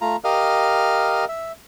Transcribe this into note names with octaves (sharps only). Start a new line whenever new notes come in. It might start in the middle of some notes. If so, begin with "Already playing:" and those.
A3 F4 A#5
G4 A#4 D#5 F5 F6
E5